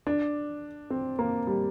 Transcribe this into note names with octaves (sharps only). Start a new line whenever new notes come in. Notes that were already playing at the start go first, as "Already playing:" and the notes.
D4
C4
A#3
G3